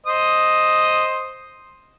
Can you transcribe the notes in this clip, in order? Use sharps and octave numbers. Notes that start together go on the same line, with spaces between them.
C5 D#5 D#6